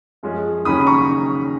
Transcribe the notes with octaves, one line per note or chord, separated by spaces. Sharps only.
F#2 F3 G#3 C#4
D#2 C#3 F#3 C#4 B5 D#6
B5
A#5 C#6